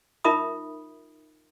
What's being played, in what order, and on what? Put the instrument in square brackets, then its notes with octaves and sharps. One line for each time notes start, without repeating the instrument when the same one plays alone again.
[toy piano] D#4 F4 A#4 E5 B5 D#6